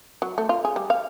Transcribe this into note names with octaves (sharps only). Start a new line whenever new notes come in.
F#3
A3
F4
G#4
G3
F5